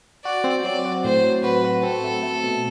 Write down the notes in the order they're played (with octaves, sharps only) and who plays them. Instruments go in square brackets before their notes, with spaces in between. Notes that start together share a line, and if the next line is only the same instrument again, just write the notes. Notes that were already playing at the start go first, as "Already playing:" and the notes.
[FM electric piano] F#4 [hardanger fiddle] D5
[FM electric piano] C4
[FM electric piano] F#3 [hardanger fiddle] D5
[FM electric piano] F#4
[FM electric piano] A2 [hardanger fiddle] C5
[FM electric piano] F#3
[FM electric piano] F#4 [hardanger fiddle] B4
[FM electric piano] F#4
[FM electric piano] C4 [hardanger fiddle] A4
[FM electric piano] A3
A3
B2